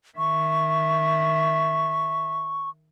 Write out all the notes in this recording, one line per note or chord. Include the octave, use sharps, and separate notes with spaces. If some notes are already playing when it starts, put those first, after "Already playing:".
D#3 E5 C#6